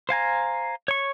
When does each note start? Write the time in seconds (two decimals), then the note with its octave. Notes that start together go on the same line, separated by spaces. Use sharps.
0.09 C5 F5 G#5 A#5
0.88 C#5 C#6